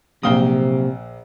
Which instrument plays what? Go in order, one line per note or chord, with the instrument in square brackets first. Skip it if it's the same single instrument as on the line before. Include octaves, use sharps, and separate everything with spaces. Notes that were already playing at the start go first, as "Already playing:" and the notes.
[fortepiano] A#1 F5 D#6 [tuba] C3 [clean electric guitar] F#3 A#3 G5